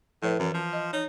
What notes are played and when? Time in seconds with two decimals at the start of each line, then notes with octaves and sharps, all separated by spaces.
0.23 A2 F3 B4 E5
0.39 F#2 E3
0.54 F3
0.73 D#5
0.93 D#4 C#5